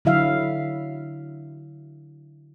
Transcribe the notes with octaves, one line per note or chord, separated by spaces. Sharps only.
D3 F#3 E4 E5 F5